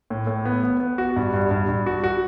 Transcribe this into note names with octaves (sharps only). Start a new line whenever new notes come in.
A2
A2
B3
B3
B3
F#4
G2
G2
G2
G2
F#4
F#4